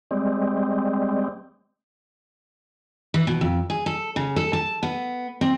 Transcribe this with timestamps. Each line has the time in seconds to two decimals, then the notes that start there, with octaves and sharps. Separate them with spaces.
0.11 G3 G#3 C4
3.14 E3
3.27 B2
3.41 F2
3.70 G#4
3.86 A4
4.16 C#3
4.36 A4
4.53 A5
4.83 B3
5.41 C4